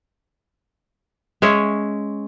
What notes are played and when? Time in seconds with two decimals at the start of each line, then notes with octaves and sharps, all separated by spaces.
1.42 G#3 C#4 C#5 E5